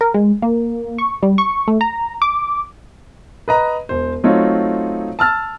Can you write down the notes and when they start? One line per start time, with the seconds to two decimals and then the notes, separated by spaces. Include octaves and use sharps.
0.01 A#4
0.14 G#3
0.42 A#3
0.98 C#6
1.23 G3
1.38 C#6
1.68 A3
1.81 A#5
2.22 D6
3.48 B4 D#5 A#5
3.89 E1 C5
4.24 F#3 A3 C4 D#4 F4 C#5
5.19 A5 E6 F6 A6